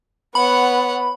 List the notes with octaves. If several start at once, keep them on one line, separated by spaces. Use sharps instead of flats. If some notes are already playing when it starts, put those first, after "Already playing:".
B3 C#5 F#5 B5